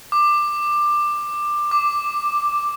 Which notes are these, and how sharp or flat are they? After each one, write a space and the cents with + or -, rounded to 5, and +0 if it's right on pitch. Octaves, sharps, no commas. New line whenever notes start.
D6 +15
D6 +0